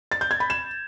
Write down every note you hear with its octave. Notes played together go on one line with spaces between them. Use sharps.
A6
G6
G#6
B5
E7